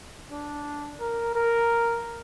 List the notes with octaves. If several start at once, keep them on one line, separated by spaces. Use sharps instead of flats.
D4
A#4
A#4